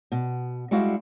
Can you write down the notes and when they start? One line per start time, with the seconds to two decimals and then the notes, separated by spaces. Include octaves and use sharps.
0.12 B2
0.71 G3 G#3 E4 F#4 F5